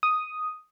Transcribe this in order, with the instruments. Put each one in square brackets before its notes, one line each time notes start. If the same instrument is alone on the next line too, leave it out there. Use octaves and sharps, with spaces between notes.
[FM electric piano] D#6